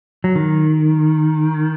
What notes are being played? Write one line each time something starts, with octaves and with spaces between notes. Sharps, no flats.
F#3
D#3